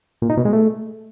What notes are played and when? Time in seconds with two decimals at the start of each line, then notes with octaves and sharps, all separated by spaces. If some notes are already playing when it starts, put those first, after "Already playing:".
0.22 A#2
0.30 D#4
0.37 B2
0.45 G#3
0.53 A3